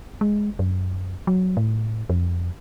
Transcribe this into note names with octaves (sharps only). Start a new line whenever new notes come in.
G#3
F#2
F#3
A2
F2